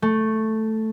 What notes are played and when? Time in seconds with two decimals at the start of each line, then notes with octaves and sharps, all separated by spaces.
0.02 A3